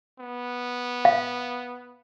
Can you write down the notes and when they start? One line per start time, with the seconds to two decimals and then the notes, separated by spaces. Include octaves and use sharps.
0.19 B3
1.05 F5